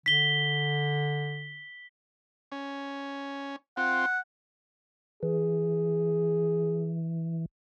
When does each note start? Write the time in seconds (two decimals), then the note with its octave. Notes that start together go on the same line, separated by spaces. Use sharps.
0.06 D3 B6 G7
2.52 C#4
3.77 C4 F4 F#5
5.23 E3 G#4